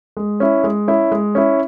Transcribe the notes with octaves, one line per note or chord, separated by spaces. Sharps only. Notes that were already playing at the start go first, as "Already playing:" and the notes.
G#3
C#4 E4
G#3
C#4 E4
G#3
C#4 E4